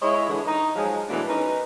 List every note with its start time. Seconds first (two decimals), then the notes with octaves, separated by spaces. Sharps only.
0.02 G#3 E4 C#5 D#5 E5
0.28 D3 E3 G#3
0.47 D#4
0.75 F3 F#3 G#3
1.09 B2 E3 F#3 G#3 A3 D4
1.28 C#4 D#4 A#4 B4